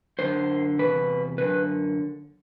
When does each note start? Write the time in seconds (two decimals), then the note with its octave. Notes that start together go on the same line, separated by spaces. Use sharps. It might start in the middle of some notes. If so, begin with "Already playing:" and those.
0.19 F#2 D3 C5
0.79 E2 C3 B4
1.38 F#2 D3 B4